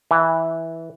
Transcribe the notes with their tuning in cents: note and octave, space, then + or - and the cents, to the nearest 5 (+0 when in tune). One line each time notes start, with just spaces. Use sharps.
E3 -10